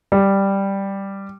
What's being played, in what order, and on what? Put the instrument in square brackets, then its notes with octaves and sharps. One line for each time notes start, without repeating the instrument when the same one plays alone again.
[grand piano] G3